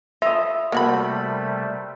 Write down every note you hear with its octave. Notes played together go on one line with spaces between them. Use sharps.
F4 E5 D#6
C3 G3 A3 A#3 F#4 B5